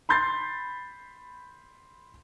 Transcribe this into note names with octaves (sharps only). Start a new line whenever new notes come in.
B5 C6 G6 A6 C7